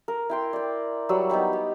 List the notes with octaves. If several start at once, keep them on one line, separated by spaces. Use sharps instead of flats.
A#4
E4 G5 C6
D5 G5
F#3 G3 F#5 E6
B3 D#4 G5 B5
G4